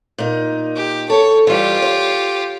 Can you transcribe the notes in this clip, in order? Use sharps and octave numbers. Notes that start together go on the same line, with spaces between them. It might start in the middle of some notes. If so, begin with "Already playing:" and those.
A#2 D#4
G4
A4 C#5
E3 G3 F4 G4
C#5